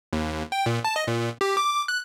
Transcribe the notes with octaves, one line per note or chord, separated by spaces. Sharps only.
D#2
G5
A#2
A5
D#5
A#2
G4
D6
F#6